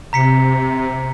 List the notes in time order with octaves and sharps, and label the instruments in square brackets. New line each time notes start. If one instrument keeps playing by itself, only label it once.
[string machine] C3 [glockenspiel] A#5 B6 C#7